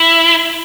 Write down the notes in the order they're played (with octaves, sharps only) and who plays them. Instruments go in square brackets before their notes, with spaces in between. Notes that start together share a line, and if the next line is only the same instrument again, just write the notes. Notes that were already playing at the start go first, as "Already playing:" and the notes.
Already playing: [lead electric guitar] E4